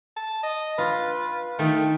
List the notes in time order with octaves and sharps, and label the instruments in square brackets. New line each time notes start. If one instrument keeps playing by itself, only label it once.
[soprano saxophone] A5
D#5
[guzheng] F4 [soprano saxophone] B4
[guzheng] D#3 G4 [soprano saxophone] A3